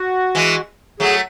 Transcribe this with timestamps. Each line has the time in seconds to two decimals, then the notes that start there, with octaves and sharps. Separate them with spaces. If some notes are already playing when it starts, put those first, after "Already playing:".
Already playing: F#4
0.35 E3 G#3
1.00 F#3 A3 G#4